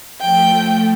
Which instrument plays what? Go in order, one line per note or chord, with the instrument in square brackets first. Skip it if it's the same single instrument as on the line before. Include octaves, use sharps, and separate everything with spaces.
[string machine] F3 A3 [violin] G5